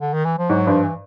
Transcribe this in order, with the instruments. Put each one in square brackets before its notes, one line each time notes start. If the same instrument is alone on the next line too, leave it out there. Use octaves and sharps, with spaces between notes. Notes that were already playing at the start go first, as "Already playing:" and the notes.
[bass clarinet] D3
D#3
E3
F3
[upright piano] G#2 [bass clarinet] F#3
[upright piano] G2 [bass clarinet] F3
[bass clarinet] E3